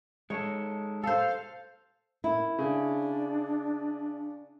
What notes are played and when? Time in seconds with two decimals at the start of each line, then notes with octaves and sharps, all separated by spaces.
0.30 G#3 D#4 A4 C#5
1.03 A4 C5 F5
2.24 E4 A#4
2.58 C#3 D4